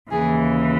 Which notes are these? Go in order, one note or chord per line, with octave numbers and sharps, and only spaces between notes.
D#2 C#3 E3 G#4